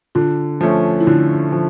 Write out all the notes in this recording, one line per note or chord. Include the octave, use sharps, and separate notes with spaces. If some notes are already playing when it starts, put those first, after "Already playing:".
D3 F4
F3 A3 C#4
E4
D3 F4
F3